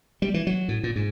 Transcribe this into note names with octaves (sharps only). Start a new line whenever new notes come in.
G3
E3
F#3
A2
A#2
G#2